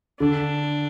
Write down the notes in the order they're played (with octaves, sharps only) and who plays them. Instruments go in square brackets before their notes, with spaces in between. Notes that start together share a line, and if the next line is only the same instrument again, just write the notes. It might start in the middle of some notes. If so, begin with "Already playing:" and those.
[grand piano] D3 [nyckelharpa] D4